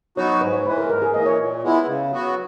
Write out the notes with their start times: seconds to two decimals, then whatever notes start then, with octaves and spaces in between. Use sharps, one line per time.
0.17 F#3 B3 D#4 F#4 C#5
0.41 G#2 B4
0.53 C#5
0.66 E3 G#3 B4
0.78 A#4
0.90 G#2 A#4
1.02 G#4
1.14 E3 A#3 D#5
1.26 C#5
1.39 A#2
1.63 G#3 B3 E4
1.87 C#3
2.11 F#3 B3 F#4